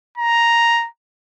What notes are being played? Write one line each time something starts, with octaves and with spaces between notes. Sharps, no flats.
A#5